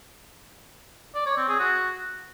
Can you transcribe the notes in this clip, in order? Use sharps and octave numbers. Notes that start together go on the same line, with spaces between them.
D5
C#5
C4
G#4
F#4